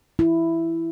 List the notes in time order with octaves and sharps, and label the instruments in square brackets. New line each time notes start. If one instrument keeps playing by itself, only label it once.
[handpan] E4